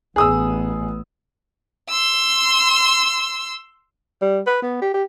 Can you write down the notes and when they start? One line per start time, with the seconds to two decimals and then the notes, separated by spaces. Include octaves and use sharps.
0.16 A1 B3 G#4 D#6 E6
1.90 C6 E6
4.22 G3
4.47 B4
4.63 B3
4.82 G4
4.94 G4